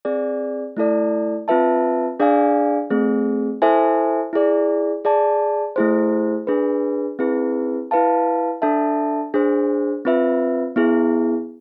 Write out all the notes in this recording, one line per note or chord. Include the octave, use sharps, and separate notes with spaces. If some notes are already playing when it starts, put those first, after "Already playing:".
C4 G#4 D5
A3 E4 A4 D5
C4 F4 B4 E5 A5
D4 G#4 D5 F5 G#5
A3 C4 G#4
E4 A4 C5 E5 G#5
E4 G#4 D5
G#4 D5 A5
A3 E4 G#4 C5
D4 G#4 B4
C4 E4 G#4 B4
E4 B4 F5 A5
D4 A4 E5 A5
D4 G#4 C5
C4 F4 B4 E5
B3 E4 G#4